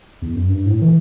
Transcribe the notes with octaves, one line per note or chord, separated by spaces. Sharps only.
E2
F#2
G2
A2
E3